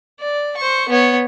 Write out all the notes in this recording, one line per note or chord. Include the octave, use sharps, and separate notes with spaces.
D5
C5 C#6
B3 C#5